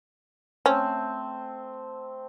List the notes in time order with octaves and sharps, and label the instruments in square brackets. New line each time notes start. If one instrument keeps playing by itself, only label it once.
[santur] A3 C4 [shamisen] C#4